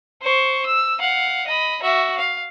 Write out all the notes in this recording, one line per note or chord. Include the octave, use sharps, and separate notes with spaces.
C5 C#6
E6
F5 F#5
D#5 B5
F#4 E5
F5